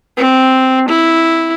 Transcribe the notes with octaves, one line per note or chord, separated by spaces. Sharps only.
C4
E4